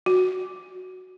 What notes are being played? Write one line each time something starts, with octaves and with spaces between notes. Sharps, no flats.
F#4